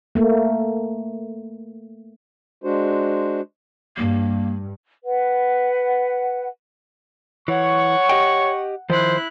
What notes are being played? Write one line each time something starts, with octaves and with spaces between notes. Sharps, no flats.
A3 A#3
G#3 D4 F#4 C5
G2 A#3
B4 F#5
E3 C#5 F#5 C#6
G4 D#5 G5
D#3 F3 E4 C5 F#6